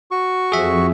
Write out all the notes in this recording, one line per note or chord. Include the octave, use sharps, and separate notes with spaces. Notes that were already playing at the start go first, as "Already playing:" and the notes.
F#4 C#6
F2 G#4 E5